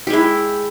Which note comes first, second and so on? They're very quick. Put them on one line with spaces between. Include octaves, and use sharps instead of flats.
G4 G#3 E4